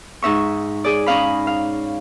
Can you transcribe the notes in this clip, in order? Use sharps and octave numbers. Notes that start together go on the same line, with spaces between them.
G#2 D#4 E5 C#6
G#4 D5
C#4 D#4 F5 B5
F5